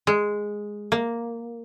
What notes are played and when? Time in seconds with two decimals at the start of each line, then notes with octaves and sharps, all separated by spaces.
0.07 G#3
0.92 A#3